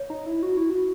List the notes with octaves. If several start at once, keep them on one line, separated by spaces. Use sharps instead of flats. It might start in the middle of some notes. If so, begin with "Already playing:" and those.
Already playing: C#5
D#4
E4
F#4
E4
F#4